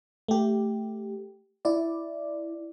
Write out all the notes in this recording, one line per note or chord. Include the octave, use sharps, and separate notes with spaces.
A3 G4
E4 D5